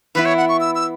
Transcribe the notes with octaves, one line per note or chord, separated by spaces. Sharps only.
E3 B3 E4 B4
C#5
F#5
C#6
E6
E6